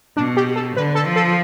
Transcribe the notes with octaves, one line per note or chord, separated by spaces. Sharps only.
B2 D4
G4
A4
D3 B4
A4
F3
A4